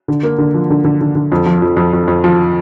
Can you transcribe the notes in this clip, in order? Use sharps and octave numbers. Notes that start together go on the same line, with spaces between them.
D3
A#3
D3
F3
D3
D3
D3
D3
F2
F3
F2
F2
F2
F2
F3